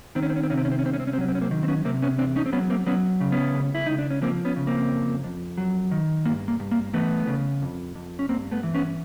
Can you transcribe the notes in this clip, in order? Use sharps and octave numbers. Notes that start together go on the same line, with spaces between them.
D#3 C4
C#4
C4
C#4
C4
C3 C#4
C4
C#4
C4
C#4
C2 C4
C#4
C4
C#4
C4
F#3 C#4
C4
C#4
A#3 C4
D#3
C4
B3 C#4
C3 A#3 C4
B3 C#4
E2 C4 D4
C#4 D#4
C4
F#3 B3 C#4
A#3 C4
F#3 B3 C#4
C#3
B3 C#4
C#2
E4
C#2 D#4
D4
C#4
F3 A#3 C4
B3 C#4
C#3
A#3 C4
F2
F2
F#3
D#3
G2 A#3
A#3
G2
A#3
E3 A3 B3
C#3
F2
F2
C#4
G2 A#3 C4
A3 B3
E3
B3 C#4